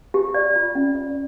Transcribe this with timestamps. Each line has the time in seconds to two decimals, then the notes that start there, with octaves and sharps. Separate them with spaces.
0.14 G4
0.34 D5
0.56 F4
0.75 C#4
0.95 D5